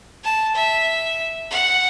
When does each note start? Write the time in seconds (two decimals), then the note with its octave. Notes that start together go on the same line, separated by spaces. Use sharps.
0.24 A5
0.56 E5
1.50 F#5